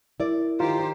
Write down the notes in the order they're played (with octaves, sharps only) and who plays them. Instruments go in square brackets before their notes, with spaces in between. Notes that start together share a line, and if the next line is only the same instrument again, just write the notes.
[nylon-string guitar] E4 D5 [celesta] A#4
[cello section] D#3 G4 C5 [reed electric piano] F4 [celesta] A#5